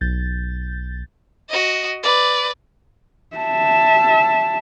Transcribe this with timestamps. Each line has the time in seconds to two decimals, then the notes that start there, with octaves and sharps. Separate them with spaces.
0.01 B1 G6 A6
1.50 F#4 D#5
2.03 B4 D5
3.37 E5 A5